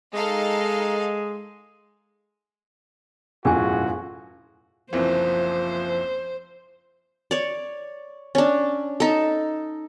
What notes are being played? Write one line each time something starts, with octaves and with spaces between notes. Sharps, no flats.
G#3 D#4 A4 F5
E1 F#2 A2 D4 F4 F#4 G#4 G#5
F#1 C2 E3 F3 C5
C#5 D5
C#4 D4
D#4 A4